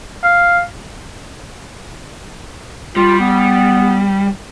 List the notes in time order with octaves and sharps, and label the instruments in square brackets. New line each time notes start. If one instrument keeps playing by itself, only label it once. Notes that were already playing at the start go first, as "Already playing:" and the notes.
[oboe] F5
[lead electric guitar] G3 [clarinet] F4
[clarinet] B3